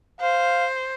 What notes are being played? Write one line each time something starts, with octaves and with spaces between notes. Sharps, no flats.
C5 F5